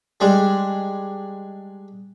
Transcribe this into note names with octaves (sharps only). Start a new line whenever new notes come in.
G3 G#3 D4